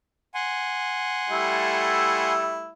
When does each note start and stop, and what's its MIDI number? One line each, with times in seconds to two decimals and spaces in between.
0.34 2.33 78
0.34 2.33 80
0.34 2.33 84
1.29 2.71 55
1.29 2.71 57
1.29 2.71 64